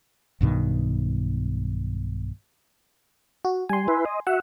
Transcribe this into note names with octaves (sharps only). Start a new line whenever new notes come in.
B1 G2 B2 D#3
F#4
G3 G#5 C6
E4 B4
D#5
F#4 E5 F#5